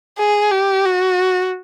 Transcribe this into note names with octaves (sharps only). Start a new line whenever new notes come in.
G#4
G4
F#4